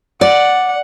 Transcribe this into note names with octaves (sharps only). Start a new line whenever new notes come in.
D5 F#5